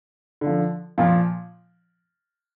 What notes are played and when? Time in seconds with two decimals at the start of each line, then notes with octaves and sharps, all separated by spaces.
0.41 D3 F3
0.98 A#2 F3